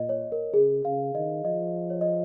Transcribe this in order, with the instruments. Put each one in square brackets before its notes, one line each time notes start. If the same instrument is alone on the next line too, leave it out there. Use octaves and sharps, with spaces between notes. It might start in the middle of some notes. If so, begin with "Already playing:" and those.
Already playing: [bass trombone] A#2 [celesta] D#5
[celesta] C#5
A#4
[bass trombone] C#3 [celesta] G#4
[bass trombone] C#3 [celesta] F5
[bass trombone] D#3 [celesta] D#5
[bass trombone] F3 [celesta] D#5
[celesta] C#5
D#5